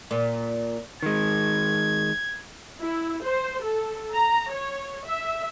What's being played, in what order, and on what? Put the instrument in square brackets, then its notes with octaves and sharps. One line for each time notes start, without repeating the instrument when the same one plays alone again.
[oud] A#2
[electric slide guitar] D#3 G#3 [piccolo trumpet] G#6
[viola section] E4
C5
A4
A#5
C#5
E5